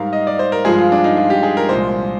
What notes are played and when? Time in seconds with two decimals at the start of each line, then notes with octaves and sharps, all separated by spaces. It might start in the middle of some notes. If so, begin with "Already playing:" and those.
Already playing: G#2 G3 A#4 F5
0.13 D#5
0.27 D5
0.39 C5
0.52 A#4
0.65 G2 F3 G#3 G#4
0.79 F4
0.92 D4
1.04 D#4
1.17 F4
1.30 G4
1.43 G#4
1.57 A#4
1.69 C2 A#2 F3 G#3 C5